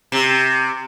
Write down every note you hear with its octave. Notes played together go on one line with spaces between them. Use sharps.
C3